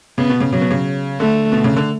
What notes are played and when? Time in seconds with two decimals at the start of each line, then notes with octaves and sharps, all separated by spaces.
0.18 C#3 B3
0.29 B2
0.40 C#3
0.52 C#3 F#3
0.61 B2
0.71 C#3
1.20 D3 A3
1.52 B2
1.64 C#3
1.76 D3